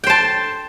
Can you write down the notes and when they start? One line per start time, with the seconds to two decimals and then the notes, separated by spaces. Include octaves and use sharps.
0.04 G5
0.07 C5
0.10 A5